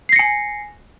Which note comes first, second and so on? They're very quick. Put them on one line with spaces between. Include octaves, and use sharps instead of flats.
C7 A#6 C#7 G#5